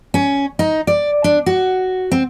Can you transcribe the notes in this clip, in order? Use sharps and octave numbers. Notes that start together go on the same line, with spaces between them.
C#4
D#4
D5
D4
F#4
C4